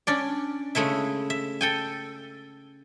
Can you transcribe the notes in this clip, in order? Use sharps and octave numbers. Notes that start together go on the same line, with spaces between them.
C#4 D4 D5
C#3 G#3 A3 E4 E5
E5
A4 G5 G#5